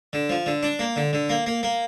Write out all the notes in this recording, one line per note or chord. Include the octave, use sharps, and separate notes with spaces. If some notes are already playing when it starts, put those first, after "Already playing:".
D3
F3
D3
D4
A#3
D3
D3
A#3
A#3
A#3